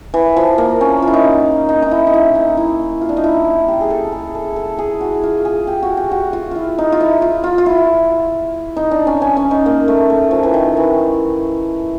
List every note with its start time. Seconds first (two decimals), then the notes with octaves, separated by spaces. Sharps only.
0.14 E3
0.36 F3
0.58 A#3
0.81 C#4
1.02 F4
1.08 E4
1.14 D#4
1.69 D#4
1.82 D#4
1.91 E4
2.07 D#4
2.13 E4
2.35 D#4
2.57 E4
3.01 F4
3.09 D4
3.17 D#4
3.24 E4
3.68 G4
3.81 G#4
3.90 A4
4.12 G#4
4.35 A4
4.56 A4
4.79 G#4
5.01 F#4
5.23 F4
5.45 G#4
5.67 G4
5.83 F#4
5.97 G4
6.11 F#4
6.33 F4
6.51 E4 F4
6.78 D#4
6.92 F4
7.01 E4
7.22 F4
7.44 F4
7.58 F4
7.66 E4
8.77 D#4
8.91 D4
9.07 C#4
9.22 C#4
9.37 C#4
9.51 D#4
9.66 A#3
9.88 A3
10.10 A3
10.31 F3
10.43 E3
10.54 D#3
10.77 E3